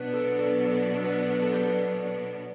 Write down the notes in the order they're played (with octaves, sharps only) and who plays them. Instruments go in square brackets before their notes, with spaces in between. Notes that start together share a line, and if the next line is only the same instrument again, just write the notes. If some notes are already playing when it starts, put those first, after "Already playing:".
Already playing: [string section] B2 F#3 B3 D4 [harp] B4
[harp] A4
A4
A4
A4
B4
A4
G4